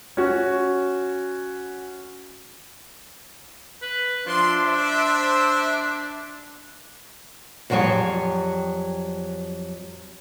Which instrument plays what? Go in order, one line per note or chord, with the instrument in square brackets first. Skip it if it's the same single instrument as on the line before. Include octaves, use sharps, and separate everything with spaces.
[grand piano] C#4 F#4
[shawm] B4
[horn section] F3 E5 C6 [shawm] D4
[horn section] C5 E5
[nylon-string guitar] F2 F#3 G3 F4 G#4 C#5